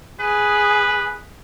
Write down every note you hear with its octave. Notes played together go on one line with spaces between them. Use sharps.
G#4 B4